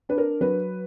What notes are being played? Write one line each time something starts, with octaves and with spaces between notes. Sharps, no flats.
D4 B4
A#4
F#3 B4